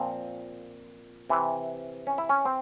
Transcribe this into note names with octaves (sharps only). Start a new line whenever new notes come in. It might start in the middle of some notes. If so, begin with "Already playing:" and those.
Already playing: A#2 F3 C4
C3 E3
C#4
E4
C#4
C4